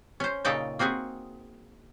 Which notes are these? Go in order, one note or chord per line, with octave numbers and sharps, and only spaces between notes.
C#4 C5
A#2 C#3 D#4 A4 G5 A5
A#3 C4 F#4 G#4